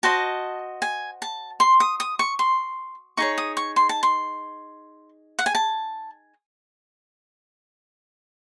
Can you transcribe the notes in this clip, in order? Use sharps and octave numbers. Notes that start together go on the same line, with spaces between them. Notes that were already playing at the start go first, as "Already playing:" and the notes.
F#4 C5 D#5 A5
G#5
A5
C6
D#6
D#6
C#6
C6
D#4 G#4 C#5 C#6
D#6
C#6
C6
A5
C6
F#5
G#5
A5